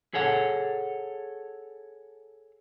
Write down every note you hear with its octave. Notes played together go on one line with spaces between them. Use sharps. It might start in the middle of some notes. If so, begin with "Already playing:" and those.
G#4 A4 C#5 F#5